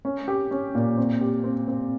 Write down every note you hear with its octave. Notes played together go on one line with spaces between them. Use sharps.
C#4
G4
C#4
A#2
C4
G4
C4
C4